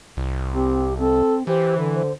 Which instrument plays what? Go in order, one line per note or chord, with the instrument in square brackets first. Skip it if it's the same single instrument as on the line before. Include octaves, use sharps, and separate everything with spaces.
[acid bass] C2
[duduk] C4 [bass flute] G4
[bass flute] C4 [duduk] A4
[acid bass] E3 [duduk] G4 [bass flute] C5
[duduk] D3
[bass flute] C5